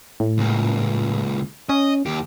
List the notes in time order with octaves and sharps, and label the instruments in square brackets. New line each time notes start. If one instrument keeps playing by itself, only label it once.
[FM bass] A2
[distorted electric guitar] C#2 A#2
[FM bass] C#4 [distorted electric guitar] D#5
[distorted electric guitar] D#2 G4